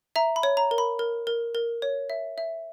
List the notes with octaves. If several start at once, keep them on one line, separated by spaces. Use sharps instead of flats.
E5 A#5
B5
C#5
A#5
A#4
B5
A#4
A#4
A#4
C#5
E5
E5